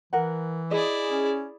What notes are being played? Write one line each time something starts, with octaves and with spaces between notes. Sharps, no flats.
E3 A#4 F#5
E4 G#4 D5 D#5
C#4